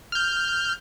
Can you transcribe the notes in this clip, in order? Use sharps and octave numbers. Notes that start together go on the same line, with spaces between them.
F6 G6